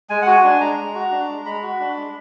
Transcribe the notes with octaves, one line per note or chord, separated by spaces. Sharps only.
G#3 G#5
F#5
F#4 G#5
D4 G#5
G#3 A#5
G#3
F#4
D4
G#3
G#3 B5
F#4
D4
G#3